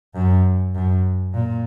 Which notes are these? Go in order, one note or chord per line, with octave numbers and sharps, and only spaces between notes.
F#2
F#2
A#2